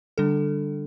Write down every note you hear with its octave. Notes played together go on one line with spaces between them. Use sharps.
D3 G3 D4 A4